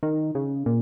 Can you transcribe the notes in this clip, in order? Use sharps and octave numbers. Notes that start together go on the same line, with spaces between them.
D#3
C#3
A#2